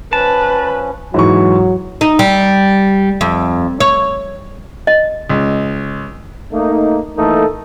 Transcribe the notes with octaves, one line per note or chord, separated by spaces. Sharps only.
F3 C#4 B4 A5
G#2 E3 F#3 C#6
D#4
G3
F2
C#5
D#5
C#2
A3 A#3 D#4
E3 A3 A#3 D#4 A4